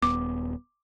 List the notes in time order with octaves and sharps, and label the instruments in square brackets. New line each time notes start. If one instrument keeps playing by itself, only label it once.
[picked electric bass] D#1 B3 [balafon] D6